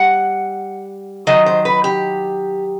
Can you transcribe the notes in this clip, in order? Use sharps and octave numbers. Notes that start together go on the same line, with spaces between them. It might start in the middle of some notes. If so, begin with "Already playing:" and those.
Already playing: G3 F#5
D#3 F#3 D#5
C5
B4
G4